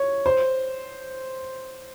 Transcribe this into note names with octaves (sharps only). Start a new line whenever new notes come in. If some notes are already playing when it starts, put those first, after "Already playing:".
Already playing: C#5
C5